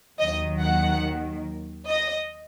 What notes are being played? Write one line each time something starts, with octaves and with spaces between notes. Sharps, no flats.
D#2 D#3 F#3 D#5
F#5
D#5